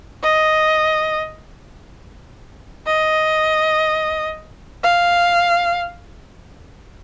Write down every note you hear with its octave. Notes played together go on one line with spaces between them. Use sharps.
D#5
D#5
F5